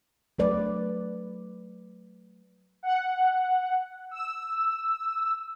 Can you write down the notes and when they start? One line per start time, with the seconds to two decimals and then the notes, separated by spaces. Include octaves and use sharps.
0.39 F#3 A3 B4 D5
2.83 F#5
4.11 E6